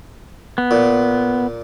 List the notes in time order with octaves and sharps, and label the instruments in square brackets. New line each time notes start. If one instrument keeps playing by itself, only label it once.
[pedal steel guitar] B3
[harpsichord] A#2